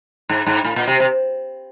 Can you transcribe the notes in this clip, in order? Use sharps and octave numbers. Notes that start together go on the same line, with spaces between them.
G#2
G#2
A2
A#2
C3
C3